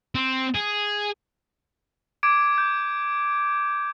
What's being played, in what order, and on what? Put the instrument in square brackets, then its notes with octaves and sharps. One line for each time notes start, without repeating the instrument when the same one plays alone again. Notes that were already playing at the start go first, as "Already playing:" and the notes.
[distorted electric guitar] C4
G#4
[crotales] D6 G#6 D7
G6